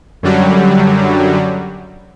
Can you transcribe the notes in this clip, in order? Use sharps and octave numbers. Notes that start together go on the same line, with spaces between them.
F#2 D3 F#3 G3